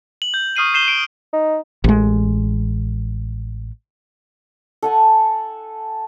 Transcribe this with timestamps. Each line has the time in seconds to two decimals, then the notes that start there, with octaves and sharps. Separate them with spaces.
0.22 F#7
0.34 G6
0.56 C#6 D#6 F6 C7 D#7 F#7
0.74 G6 C7 E7 G7
0.88 D7
1.33 D#4
1.84 A1 G#3
4.82 A4 F#5 G#5